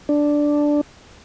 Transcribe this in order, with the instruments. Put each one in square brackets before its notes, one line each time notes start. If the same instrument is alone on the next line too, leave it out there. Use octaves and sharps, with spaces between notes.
[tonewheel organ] D4